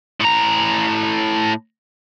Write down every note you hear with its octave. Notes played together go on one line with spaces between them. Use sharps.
A2 A#5